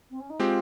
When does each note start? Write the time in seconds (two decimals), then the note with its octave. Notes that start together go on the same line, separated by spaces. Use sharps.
0.10 C4
0.20 C#4
0.29 D#4
0.39 G#3 C4 F4 G4